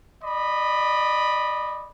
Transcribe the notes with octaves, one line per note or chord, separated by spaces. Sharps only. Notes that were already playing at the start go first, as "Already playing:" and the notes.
D5 D#5 B5